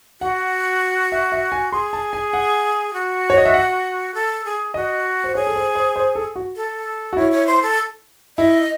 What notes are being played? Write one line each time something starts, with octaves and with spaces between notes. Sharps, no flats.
F#4 F#5
E5
E5
G#5
G#4 C6
A5
G#5
F#5
F#4
C#5
D#5
E5
F#5
A4
G#4
F#4 D#5
C5
G#4 C#5
A4
C5
C5
C5
A4
F#4
A4
F#4
E4 C#5
C#5
C5
A4
E4 D#5